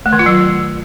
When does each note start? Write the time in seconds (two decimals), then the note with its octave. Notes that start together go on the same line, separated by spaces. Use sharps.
0.06 A3
0.12 D#3
0.19 F4
0.26 F#3